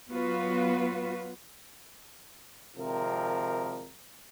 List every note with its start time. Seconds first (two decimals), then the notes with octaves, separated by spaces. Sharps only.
0.11 F#3 B3 F4 F#4 B4
2.77 G#1 C3 F3 A#4